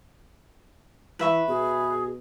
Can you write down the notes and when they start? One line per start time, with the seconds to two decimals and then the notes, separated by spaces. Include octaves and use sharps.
1.19 E3 B4 E5 C#6
1.48 B2 G#4